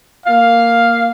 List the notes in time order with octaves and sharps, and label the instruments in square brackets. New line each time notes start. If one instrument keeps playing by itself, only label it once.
[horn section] A#3 F5